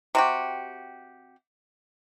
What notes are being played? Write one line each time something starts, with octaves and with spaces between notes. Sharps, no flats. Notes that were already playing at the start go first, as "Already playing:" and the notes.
C3 F#4 G4